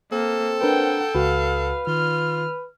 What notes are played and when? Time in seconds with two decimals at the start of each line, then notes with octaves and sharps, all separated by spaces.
0.12 A#3 C4 A4
0.61 D4 A#4 B4 F#5 G5
1.15 C#2 F#4 B4 F5
1.87 D#3 F4 F6